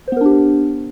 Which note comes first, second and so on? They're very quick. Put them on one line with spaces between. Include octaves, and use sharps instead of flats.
C5 B3 A#4 D4 G4